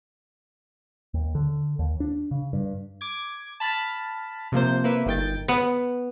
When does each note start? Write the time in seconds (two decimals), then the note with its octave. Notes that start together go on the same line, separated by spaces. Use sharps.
1.14 D#2
1.35 D3
1.79 D#2
2.00 D4
2.31 C#3
2.53 G2
3.01 D6 G#6
3.60 A5 B5 F6 A6
4.52 C3 F3 A#3 C5
4.84 C3 A#3 E4 B4
5.06 G1 D#3 G5 A6
5.48 B3